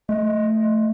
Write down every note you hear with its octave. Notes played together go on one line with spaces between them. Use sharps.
A3 D#5